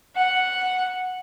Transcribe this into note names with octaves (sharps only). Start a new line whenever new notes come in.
F#5